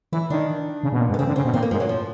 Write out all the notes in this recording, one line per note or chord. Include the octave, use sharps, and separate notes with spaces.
E3 E4
D#3 D4
C#3
B2
A#2
G#2
B3
C#3 C4
D3
C#3 C4
B2
A#2 C4
A#3
G#2 F3
F#3
F3